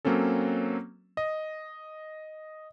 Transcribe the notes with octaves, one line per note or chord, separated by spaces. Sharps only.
F#3 A#3 C4 C#4 A4
D#5